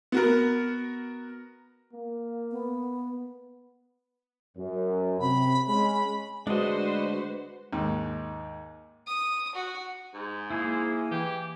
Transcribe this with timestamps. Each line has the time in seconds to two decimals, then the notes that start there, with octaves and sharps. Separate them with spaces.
0.12 B3 F#4 A#4
1.93 A#3
2.51 B3
4.58 F#2
5.20 C3 B5
5.67 G#3 C#4 B5
6.47 D2 G#3 D4 F#4 B4 C5 D#5
7.73 D#2 G#2
9.07 D#6
9.55 F#4
10.14 G#2
10.50 A#3 E4 G#4
11.11 E3 G4